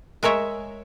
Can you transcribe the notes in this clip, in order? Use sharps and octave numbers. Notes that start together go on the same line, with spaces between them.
G#3 A#4 C#5 E5